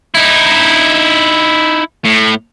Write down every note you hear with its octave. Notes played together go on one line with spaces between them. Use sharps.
D#4 E4
A2